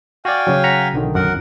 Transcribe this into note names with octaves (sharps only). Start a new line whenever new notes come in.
F#4 D5 F5 G5 G#5
C#3 F#3
F#5 A#5 B6
B1 D3 D#3
F#2 A#4 F#5